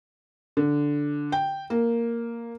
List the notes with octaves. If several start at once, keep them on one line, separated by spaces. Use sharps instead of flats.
D3
G5
A#3